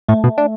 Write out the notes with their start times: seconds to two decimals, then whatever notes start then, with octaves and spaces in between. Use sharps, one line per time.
0.08 A2 A3
0.24 B2
0.38 D4